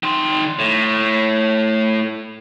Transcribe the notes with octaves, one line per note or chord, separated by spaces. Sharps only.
D#3 C6
A2